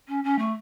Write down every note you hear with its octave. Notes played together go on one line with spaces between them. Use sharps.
C#4
C#4
A3